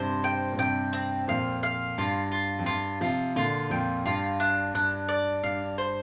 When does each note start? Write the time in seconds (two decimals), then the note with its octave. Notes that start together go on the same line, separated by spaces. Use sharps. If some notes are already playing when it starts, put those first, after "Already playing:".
Already playing: G2 C3 C5
0.24 G5
0.52 A#2
0.59 G2 C3 G5
0.93 C4
1.28 F2 A#2 F5
1.63 F5
1.98 G2 F4
2.32 F4
2.59 F2
2.66 G2 F4
3.01 C3 F3 F4
3.36 A#2 D3 F4
3.70 F2 A#2 G5
4.06 G2 F4
4.40 D4
4.74 G2 D4
5.09 D5
5.43 G2 F5
5.78 C5